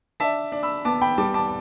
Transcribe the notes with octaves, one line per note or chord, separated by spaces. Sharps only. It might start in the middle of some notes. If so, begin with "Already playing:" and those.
D4 E5 A5
D4
B5 E6
B3 A5 D6
G5 B5
G3 A5 D6
A5 D6